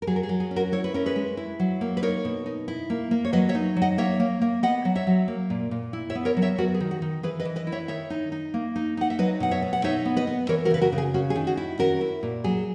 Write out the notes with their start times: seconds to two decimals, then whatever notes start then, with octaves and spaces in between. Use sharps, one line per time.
0.02 A#4
0.07 F#3 G#4
0.16 A#4
0.23 G#4
0.29 F#3
0.40 G#4
0.51 C#4
0.56 F#4 A#4
0.72 E4 C#5
0.84 B4
0.94 C#4 A#4
1.06 G#4 B4
1.16 G#3
1.37 E4
1.60 F#3
1.81 A#3
1.97 B4
2.02 D#4 A#4 C#5
2.25 B2
2.46 D#4
2.68 E4
2.90 A#3
3.11 A#3
3.25 C#5
3.33 F#3 B4 D#5
3.49 C#5 E5
3.55 D#4
3.77 F#3
3.82 D#5 F#5
3.98 A#3 C#5 E5
4.20 A#3
4.41 A#3
4.63 B3 D#5 F#5
4.85 F#3
4.95 C#5 E5
5.07 F#3
5.28 A#3
5.50 A#2
5.71 A#2
5.93 E4
6.10 C#5 E5
6.15 B3
6.25 A#4 C#5
6.37 F#3
6.42 C#5 E5
6.58 B3 F#4 A#4
6.75 G#4
6.80 D#3
6.91 F#4
7.02 D#3
7.23 E3 G#4 B4
7.40 B4 D#5
7.45 E3
7.56 B4 D#5
7.67 E4
7.72 C#5 E5
7.88 D#3 C#5 E5
8.10 D#4
8.32 D#4
8.54 A#3
8.76 D#4
8.97 D#4 F#5
9.10 E5
9.19 F#3 B4 D#5
9.40 B2 F#5
9.51 C#5 E5
9.62 B3
9.73 F#5
9.84 D#4 C#5 E5
10.05 B3
10.16 B4 D#5
10.27 B3
10.49 E3 A#4 C#5
10.65 F#4 A#4
10.71 C#3 B4
10.81 F#4 A#4
10.92 C#3
10.98 G#4
11.14 C#4 F#4
11.30 G#4
11.36 D#3
11.47 F#4
11.57 E4
11.79 C#4 F#4 A#4
12.01 E4
12.23 A#2
12.44 F#3 G#4